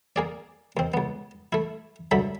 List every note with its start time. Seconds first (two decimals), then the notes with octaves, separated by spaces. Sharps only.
0.16 A#3 G#4 D5
0.77 D#2 C4
0.94 C#2 B3
1.53 A3 E4
2.11 C#2 G2 D3 F#3 E5 B5